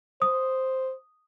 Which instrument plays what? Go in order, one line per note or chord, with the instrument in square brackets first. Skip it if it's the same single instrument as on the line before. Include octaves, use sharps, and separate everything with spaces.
[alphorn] C5 [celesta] D#6